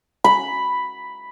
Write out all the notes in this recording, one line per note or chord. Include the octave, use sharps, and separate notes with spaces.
B5